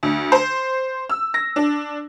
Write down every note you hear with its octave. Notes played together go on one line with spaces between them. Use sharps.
D2
C5
E6
A#6
D4